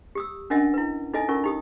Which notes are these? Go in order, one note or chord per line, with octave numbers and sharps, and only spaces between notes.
G4 D#6 E6
C#4 D4 A#4 D#5 E5 F#5
E4 B4
D#4 A4 D#5 E5 G#5
C#4 F4 A#4 C#6
D#4 G4 D#6